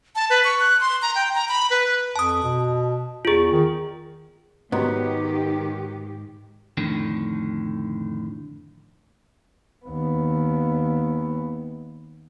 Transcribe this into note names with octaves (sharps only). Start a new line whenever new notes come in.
A5
B4
C#6
F#6
C6
A#5
G5
A#5
B5
B4
F2 A5 D#6
B2
E2 F4 G#4
D#3
G#2 D#3 F#3 G#3 B3 G4
F2 A2 D3 D#3
D#2 B3